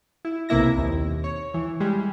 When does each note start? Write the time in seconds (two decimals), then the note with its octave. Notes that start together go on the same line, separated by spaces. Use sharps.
0.25 E4
0.49 B1 C3 A#3 E4 A#6
0.78 D#2
1.24 C#5
1.54 E3
1.80 G3 G#3